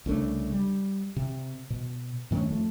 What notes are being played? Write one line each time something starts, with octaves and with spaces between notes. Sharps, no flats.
C2 C#3 A3 D4
G3
C3
B2
G2 D#3 A3 C#4
F2 A3